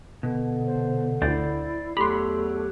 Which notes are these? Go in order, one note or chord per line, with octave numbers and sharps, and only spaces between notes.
B2 D3
C5
D2 E4 C5 D5
E2 F#3 A3 G4 B5 C6